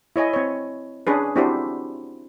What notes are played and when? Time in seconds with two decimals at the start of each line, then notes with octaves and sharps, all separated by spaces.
0.16 E4 C#5 D#5 G#5
0.34 C4 C#5
1.07 C#4 D4 G#4 B4
1.36 C4 D4 E4 F#4 G4 C5